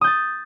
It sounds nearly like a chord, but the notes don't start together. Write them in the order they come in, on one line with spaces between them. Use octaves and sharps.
D#6 G6 A6